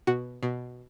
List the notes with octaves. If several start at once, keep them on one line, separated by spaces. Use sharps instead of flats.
B2 F#4
B2